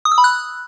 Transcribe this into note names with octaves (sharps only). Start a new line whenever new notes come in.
D#6
E6
B5
F#6